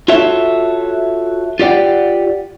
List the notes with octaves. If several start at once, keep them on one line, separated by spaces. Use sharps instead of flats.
F4 F#4 A4 C#5 E5
F4 G4 D5 F#5 G5